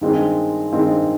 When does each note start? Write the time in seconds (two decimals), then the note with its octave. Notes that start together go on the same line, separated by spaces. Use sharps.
0.01 G2 D#3 G#3 C4
0.72 G2 D#3 G#3 C4